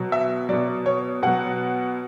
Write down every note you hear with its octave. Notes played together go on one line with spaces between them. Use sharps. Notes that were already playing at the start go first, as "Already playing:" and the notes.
Already playing: B2 F#3
E5
B2 F#3 D5
C#5
B2 F#3 F#5